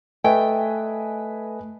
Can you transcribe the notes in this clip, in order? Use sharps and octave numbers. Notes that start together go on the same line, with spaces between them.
A3 B4 D#5 G5 G#5